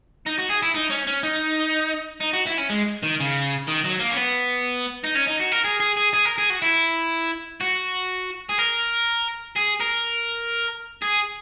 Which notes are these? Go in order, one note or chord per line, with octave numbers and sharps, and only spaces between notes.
D#4
F#4
G#4
E4
D#4
C#4
C#4
D#4
D#4
F#4
E4
C#4
G#3
D#3
C#3
D#3
F#3
A#3
C#4
B3
D#4
C#4
D#4
F#4
A#4
G#4
G#4
G#4
G#4
A#4
G#4
F#4
E4
F#4
G#4
A#4
G#4
A#4
G#4